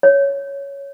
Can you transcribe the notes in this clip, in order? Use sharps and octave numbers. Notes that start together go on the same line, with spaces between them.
C#5